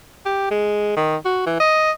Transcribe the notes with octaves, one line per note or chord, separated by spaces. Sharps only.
G4
G#3
D#3
F#4
E3
D#5